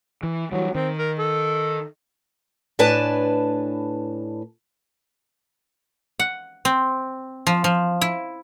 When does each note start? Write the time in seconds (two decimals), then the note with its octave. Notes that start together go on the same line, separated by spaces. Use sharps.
0.23 E3
0.52 E3 F#3 G3
0.75 D#3 C4
0.98 A#4
1.19 A4
2.79 A2 D4 B4 G#5 A5
6.19 F#5
6.65 C4
7.47 F3
7.64 F3
8.01 E4